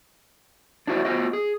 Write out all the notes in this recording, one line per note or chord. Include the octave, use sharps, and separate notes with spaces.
D4 E4 F#4 C5 E5
B3 F4 F#4 C5 D#5
G#4